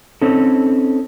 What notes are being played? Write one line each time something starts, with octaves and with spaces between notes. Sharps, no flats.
C4 C#4 D#4 A4